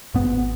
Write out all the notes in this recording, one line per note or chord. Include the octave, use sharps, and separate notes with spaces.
G#1 G#2 B3